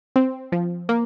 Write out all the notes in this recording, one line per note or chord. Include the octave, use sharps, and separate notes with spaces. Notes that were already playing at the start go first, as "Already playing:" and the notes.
C4
F3
A#3